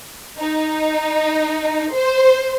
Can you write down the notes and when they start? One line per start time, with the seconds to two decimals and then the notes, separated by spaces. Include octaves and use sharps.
0.39 D#4
1.92 C5